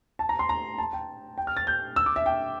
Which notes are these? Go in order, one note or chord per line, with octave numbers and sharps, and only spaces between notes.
A5
A#5
C6
A#5
A5
G5
G5
F6
A6
G6
E6
D6
E5
G5